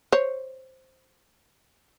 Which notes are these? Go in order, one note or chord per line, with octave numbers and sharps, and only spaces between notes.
C5 C#5